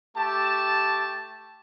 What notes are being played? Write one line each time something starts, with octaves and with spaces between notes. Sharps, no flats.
A3 G4 A5